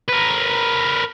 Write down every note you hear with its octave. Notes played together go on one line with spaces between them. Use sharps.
A#4 B4